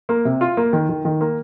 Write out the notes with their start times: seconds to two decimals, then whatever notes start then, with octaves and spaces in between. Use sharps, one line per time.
0.09 A#3
0.25 C3
0.41 F4
0.57 A#3
0.73 D#3
0.89 D#3
1.05 D#3
1.21 A#3